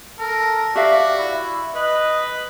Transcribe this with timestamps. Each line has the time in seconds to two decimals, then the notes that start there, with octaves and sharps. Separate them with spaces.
0.19 A4 A#4
0.76 F#4 G4 D5 E5 F5
1.18 E4
1.75 B4 D#5